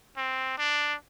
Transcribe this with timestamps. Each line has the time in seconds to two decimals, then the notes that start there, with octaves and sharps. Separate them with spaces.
0.17 C4
0.58 D4